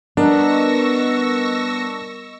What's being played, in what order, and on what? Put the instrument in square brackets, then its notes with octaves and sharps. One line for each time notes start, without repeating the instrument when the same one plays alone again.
[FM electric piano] G3 A#4 D#5 [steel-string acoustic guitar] B3 [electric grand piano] D4 [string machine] C#6 E6 A#6